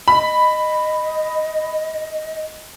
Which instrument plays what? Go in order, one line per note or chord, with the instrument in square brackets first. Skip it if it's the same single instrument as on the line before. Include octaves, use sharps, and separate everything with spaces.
[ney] D#5 [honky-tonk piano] B5